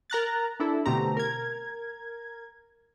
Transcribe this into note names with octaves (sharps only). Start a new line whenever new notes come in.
A#4 A#5 F#6 A6
D4 E4 A4
B2 D3 A3 C4 G4 A#5
A#4 G#6